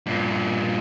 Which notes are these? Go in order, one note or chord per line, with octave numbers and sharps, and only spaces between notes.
G2 A#2